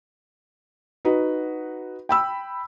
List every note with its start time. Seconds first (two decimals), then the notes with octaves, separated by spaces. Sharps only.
1.05 D#4 F#4 B4
2.09 G5 B5 E6